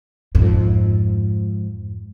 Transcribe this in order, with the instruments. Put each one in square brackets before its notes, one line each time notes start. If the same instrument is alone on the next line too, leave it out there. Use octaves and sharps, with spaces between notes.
[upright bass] F2 G#2